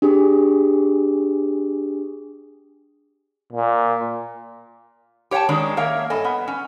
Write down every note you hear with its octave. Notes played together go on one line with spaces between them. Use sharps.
D4 G4 G#4 D#6
A#2
G4 C#5 F#5 G5 A5
D#3 G#3 C#4 D4
A#3 C#5 E5 F5
G2 A4 D#5 G#5
B3
C#4